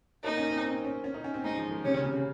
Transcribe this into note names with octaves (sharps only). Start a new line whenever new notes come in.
A#3 D#4
C#4
C4
C4
C#4
C#4
D#4
C#4
C4
G#3 D#4
F3
D#3
C3 C#4
C#3
C3
C#3